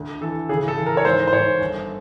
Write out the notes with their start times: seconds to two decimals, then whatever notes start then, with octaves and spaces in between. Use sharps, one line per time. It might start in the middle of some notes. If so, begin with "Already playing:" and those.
Already playing: D2 D3
0.21 E3 A4
0.49 C#3 G#4
0.68 A4
0.77 E3
0.86 A#4
0.97 C#5
1.05 G#2 C5
1.28 C5
1.33 G#2 C#5
1.61 G1